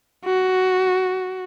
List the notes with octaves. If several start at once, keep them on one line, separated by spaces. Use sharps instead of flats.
F#4